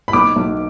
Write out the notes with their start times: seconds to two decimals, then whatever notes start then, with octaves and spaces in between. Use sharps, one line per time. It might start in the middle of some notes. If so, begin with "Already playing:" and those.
0.08 B5
0.13 B1 D6
0.36 B1